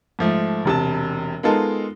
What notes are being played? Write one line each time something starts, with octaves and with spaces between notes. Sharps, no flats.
G#2 F3 A3
E1 C3 A5
G#3 B3 D#4 F4 A4 A#4